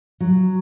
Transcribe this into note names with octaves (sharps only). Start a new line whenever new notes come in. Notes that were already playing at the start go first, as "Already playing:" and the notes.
F#3